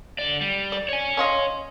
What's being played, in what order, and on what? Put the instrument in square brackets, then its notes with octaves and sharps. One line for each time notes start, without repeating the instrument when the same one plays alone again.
[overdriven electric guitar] D3 D5
G3
[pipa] D5
[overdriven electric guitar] C#5 G#5
[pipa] C#4 F4 D#5